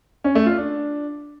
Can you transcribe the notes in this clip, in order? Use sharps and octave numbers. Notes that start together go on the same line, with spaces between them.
C#4
A3
F4
D4